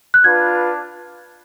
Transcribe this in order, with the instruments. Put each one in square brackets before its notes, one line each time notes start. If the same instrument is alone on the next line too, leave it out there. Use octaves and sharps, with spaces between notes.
[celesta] F#6
[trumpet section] D4 F4 B4 [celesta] G#6